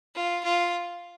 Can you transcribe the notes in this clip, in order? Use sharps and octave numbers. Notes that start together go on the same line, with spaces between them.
F4
F4